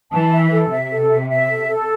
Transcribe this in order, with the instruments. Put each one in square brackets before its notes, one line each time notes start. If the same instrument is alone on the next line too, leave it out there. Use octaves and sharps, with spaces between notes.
[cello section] E3 [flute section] A5
[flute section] E5
A4
[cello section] C3 [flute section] E5
[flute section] A4
E5
E5
A4
A4